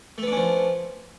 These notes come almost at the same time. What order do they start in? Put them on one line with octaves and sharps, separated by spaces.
A3 B3 D4 C#4 F3